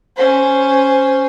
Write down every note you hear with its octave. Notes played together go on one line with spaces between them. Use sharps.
C#4 C5